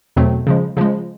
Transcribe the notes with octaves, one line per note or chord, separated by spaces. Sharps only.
E2 B2 F#3 A3 C4
C#3 F3 G#3
C#3 F3 G#3